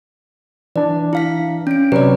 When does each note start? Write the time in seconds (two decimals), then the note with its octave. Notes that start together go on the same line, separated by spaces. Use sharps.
0.76 E3 D4 D5
1.13 E4 F5 B6
1.67 C#4 D7
1.92 C3 F#3 B4 D5